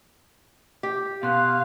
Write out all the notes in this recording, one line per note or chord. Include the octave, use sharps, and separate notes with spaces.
G4
B2 F5 C6 F#6